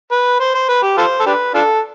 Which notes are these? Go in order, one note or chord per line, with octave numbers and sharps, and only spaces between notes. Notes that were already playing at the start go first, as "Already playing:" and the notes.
B4
C5
C5
B4
G4
F4 A4 C5
A4
D4 G4 B4
D4 F4 A4